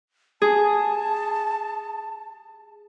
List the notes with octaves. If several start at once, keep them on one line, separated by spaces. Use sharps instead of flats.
G#4 A5